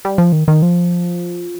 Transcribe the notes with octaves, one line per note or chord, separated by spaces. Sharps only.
G3
F3
D#3
D#3
F3